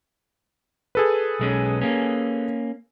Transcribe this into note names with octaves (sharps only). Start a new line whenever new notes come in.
G#4 A4 B4
B1 G#3 C#4
A#3 C#4